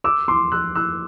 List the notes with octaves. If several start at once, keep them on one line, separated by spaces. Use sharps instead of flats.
D6 E6
C6 D6
E6 F#6
E6 F#6